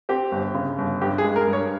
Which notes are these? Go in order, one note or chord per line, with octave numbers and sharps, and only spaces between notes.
C4 G4
G1
C#3
G1
G2 G4
G#4
G#3
A#4
G2
C#5